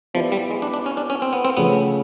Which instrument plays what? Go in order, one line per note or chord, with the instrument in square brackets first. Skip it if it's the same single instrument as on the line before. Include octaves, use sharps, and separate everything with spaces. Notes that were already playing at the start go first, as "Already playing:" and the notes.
[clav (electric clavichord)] F3 [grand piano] B3 E4 G4 B4 D5
[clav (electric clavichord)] G3
G#3
D4
D4
C#4
D4
C#4
C4
B3
C4
[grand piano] C#3 F3 A3 C#4 [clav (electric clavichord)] B3